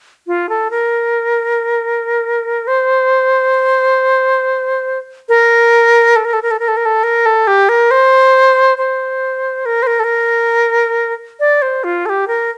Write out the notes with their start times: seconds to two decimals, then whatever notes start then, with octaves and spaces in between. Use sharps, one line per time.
0.27 F4
0.49 A4
0.71 A#4
2.67 C5
5.29 A#4
6.16 A4
6.25 A#4
6.33 A4
6.43 A#4
6.51 A4
6.59 A#4
6.68 A4
6.77 A#4
6.86 A4
7.03 A#4
7.26 A4
7.47 G4
7.69 A#4
7.91 C5
8.78 C5
9.66 A#4
9.83 C5
9.87 A#4
10.00 A4
10.04 A#4
11.40 D5
11.62 C5
11.84 F4
12.06 A4
12.09 G4
12.28 A#4